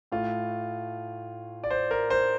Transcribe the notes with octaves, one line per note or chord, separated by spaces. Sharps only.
A2 A3 F4
D5
C5
A#4
C5